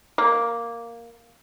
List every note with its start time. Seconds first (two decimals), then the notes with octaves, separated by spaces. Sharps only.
0.18 A#3